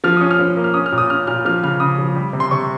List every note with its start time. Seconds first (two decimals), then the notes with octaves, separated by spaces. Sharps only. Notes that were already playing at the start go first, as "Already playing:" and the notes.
0.04 F3 F6
0.17 C#4 D#6
0.31 F6
0.39 F3
0.56 A#3
0.64 F6
0.74 C#4 D#6
0.86 F6
0.92 A#2
0.98 D#6
1.10 C#4 F6
1.27 A#2 F6
1.45 F3 F6
1.63 C#3 F6
1.80 C#3 D#6
1.98 F3
2.16 G3
2.33 C3
2.40 C6
2.51 C3 C#6